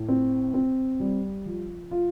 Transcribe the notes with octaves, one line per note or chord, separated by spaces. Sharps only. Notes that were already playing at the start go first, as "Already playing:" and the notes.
Already playing: A2
C4
C4
G3
F3
F4